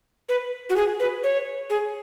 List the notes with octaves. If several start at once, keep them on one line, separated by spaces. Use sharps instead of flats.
B4
F#4
G#4
B4
C#5
G#4